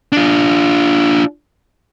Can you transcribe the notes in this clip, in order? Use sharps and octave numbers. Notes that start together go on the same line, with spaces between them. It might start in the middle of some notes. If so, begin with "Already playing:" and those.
D4 F4